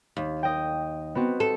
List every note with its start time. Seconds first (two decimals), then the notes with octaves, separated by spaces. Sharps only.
0.17 D#2
0.43 D#5 G5
1.15 B3 C4 F#4
1.40 A4